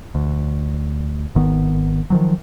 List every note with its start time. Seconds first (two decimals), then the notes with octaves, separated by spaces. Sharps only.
0.15 D2
1.35 G#1 D#3 B3
2.10 D#3 F3 F#3